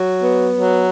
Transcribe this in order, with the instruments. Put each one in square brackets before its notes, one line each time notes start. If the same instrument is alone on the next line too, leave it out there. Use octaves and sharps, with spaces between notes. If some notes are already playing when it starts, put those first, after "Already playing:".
Already playing: [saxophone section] F#3
B3
F#3